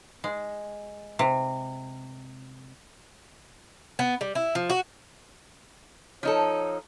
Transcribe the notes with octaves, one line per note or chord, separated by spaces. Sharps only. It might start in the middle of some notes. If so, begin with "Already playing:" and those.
G#3
C3
B3
G3
E4
F3
F#4
F3 D#4 A4 C#5